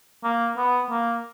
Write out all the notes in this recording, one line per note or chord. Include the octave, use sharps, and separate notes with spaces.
A#3
B3
A#3